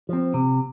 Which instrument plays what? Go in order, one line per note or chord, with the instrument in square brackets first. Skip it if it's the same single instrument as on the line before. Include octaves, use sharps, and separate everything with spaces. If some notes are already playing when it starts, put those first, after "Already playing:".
[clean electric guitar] F3 C4
C3